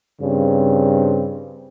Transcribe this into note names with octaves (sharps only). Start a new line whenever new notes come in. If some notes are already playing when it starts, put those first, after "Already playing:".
G2 C#3 C4